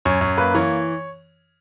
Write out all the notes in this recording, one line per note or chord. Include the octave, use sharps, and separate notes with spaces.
F#2 C#5
F#2
A#3 B4
E3 C#5